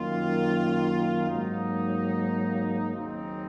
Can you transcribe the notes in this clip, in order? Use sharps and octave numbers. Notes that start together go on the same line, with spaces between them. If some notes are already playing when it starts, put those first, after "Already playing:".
Already playing: F#2 D#3 A#3 F4
G#2 F#3 A#3 D#4
D#2 C#3 F#3 C4 D#4